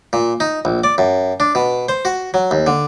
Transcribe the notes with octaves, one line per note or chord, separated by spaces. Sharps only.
A#2
D#4
A#1
D5
F#2
D4
B2
C5
F#4
F#3
D#2
D3